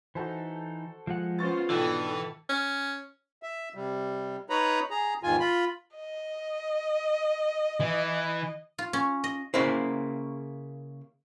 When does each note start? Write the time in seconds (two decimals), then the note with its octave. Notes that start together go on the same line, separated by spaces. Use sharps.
0.15 E3 D#4 F#4 A4 C5
1.07 F3 G#3 F#5
1.39 B3 C#4 F4 C5 C#6 A6
1.70 G#2 B2 E3 D4 A4 G5
2.49 C#4
3.43 E5
3.75 C3 G3
4.50 D#4 B4 C#5 A#5 B5
4.91 G#4 A#5
5.23 E2 G#2 D#3 F4 G#5
5.40 F4 B5
5.96 D#5
7.81 E3
8.78 F4
8.93 C#4
9.24 D#5
9.54 C#3 A#3 E4 C5